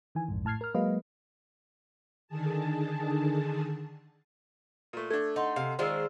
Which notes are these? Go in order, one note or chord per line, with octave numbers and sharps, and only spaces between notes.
D#3 E3 G#5
A#1 F2 G#2
A2 A5 F6 G#6 C7
A#4 F6
F#3 G#3 A#3 B4 D#5 F5
D3 D#3 G#4 A5
A#2 A3
A3 D4 A4 G#6
D#4 D#5 F#5 C6
C3 F5
D#3 G#3 F4 C5 D5 E6